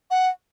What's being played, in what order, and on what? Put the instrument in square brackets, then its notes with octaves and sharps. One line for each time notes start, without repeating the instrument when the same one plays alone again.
[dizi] F#5